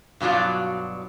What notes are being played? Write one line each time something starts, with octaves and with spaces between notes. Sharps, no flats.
G2 B2 F#3 D4 F4